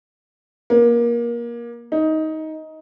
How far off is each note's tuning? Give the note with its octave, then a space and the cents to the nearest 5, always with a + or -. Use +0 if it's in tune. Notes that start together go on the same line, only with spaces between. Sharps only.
A#3 +25
D#4 +15